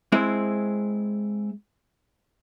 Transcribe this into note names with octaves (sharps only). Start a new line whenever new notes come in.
G#3 C4 E4